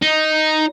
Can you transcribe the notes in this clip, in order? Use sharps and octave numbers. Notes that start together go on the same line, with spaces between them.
D#4